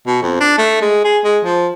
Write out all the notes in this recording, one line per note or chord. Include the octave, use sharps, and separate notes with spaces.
B2
F2
D4
A3
G#3
G#4
G#3
F3